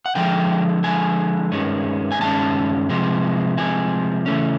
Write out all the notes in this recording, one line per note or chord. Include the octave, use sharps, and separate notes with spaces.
F#5
D3 F3 G#3 G5
D3 F3 G#3 G#5
G2 D#3 G#3 C#4
G#5
G2 D#3 G#3 C#4 A5
C3 F3 G#3
C3 F3 G#3 G#5
C#3 E3 A3 C#4